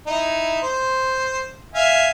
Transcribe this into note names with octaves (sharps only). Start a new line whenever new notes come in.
D#4 E4
C5
E5 F5 G#5